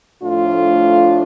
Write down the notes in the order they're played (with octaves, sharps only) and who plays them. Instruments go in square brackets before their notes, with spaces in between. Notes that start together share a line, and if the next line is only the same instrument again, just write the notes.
[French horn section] A2 F3 A3 D4 F4